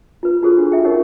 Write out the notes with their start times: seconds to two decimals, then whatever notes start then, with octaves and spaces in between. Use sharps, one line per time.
0.23 F4 B4
0.43 F4 F#4 G#4 A4 C5
0.57 D4 F#4
0.72 F4 E5 G5
0.84 C#4 D#4 A#4 C#5 F#5 C#6